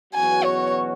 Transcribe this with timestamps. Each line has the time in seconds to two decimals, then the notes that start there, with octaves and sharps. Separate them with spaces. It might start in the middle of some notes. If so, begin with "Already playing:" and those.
0.14 E2 B2 F#3 C#4 F#4 G#5
0.44 C#5